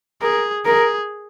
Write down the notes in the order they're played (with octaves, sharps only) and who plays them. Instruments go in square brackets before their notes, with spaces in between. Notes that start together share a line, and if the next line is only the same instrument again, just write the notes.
[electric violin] G#4 [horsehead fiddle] A#4
[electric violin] G#4 [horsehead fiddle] A#4